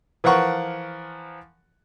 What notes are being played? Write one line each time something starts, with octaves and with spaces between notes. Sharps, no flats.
E3 F3 A#4 F#5 C#6